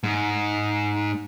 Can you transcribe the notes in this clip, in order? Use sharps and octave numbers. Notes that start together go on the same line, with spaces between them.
G#2